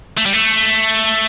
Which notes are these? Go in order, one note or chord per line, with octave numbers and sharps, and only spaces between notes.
A3
G3
A3